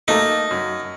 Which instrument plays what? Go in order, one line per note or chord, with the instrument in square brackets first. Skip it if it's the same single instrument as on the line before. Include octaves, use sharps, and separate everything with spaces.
[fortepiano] A3 A#3 A4 [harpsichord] D#4
[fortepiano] F#2